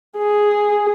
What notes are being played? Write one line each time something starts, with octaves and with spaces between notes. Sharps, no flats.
G#4